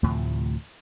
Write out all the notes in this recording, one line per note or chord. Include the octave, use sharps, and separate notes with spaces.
D2 A2 C3 F3